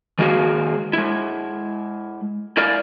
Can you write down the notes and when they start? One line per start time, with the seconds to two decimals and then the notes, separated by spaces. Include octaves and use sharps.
0.19 D#3 G#3 A#3 F#4 G#4 F5
0.93 G#3 E4
2.57 E4 A#4 D5 F5